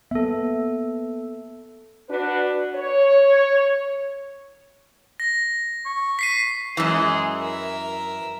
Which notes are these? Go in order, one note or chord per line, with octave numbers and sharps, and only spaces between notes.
A#3 B3 A4 E5
D4 F#4 B4
C#5
A#6
C#6
B6 C7 D#7
F#2 E3 G#3 G#4
A#4 E5